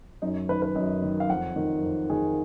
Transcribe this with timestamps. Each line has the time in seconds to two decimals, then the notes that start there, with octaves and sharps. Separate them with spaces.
0.22 F#2 D#4
0.49 D#3 B4
0.62 B4
0.75 F#2 D#5
1.02 D#3
1.20 F5
1.29 F2 F#5
1.56 D#3
1.83 F2
2.10 D#3 G#4